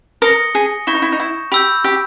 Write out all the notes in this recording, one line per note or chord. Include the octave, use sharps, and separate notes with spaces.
A#4 D#6 A#6 C#7 G7
G#4
E4 C#6 G6 A#6 E7
D#4
E4
D#4
E4
G4 B5 E6 G6
G4